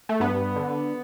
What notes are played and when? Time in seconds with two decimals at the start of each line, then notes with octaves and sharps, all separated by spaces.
0.09 A3
0.20 G2 B3
0.56 D3